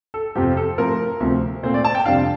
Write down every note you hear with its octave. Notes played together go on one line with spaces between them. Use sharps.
A4
F2 C3 F3 G4
A4
A2 F3 C4 A#4
D2 C3 F3 C4
A#2 A3 C4 C5
D5
A5
G5
F2 C3 G3 D4 F5